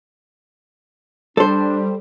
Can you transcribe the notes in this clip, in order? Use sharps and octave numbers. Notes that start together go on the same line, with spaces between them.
G3 D4 A4 C5